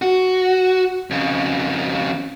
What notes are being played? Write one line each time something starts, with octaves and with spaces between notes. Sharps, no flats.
F#4
F2 C#3